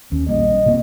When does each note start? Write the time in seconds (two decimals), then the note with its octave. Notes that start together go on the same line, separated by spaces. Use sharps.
0.12 D#2 C#4
0.29 A#1 G3 A#3 D#5
0.66 B2 A#3 C4